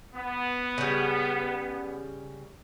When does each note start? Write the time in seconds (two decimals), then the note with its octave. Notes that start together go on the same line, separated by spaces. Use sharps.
0.13 B3
0.78 C#3 G3